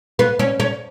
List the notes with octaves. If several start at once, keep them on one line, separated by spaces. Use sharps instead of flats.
B3
C#4
C#4